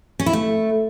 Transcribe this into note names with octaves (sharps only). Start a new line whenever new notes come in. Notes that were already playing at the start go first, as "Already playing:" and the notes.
C#4
E4
A3